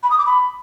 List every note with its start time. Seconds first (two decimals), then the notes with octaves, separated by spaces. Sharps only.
0.03 B5
0.11 D#6
0.18 D6
0.26 B5